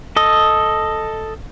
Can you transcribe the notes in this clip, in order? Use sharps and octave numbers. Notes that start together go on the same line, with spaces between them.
A4 D#5